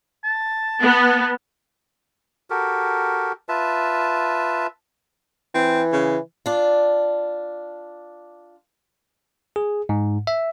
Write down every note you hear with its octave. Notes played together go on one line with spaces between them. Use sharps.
A5
B3
F#4 G4 A4 A#4
F4 B4 E5 A5
E3 C4
C#3
D4 F4
G#4
G#2
E5